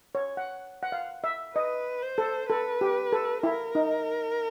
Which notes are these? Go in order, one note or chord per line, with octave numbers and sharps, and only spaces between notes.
C#5
F#5
F#5
F5
E5
B4 D#5
C5
A4
A4 B4
G4
A4
E4 A#4
D#4